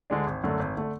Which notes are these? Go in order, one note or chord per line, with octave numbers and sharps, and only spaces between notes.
D2 D3 G#3 D4
G#1
F#2 D3 A3
G#1
D3 A3